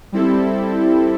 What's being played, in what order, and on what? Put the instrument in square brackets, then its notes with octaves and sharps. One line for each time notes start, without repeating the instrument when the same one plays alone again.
[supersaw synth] G3 C4 E4 A4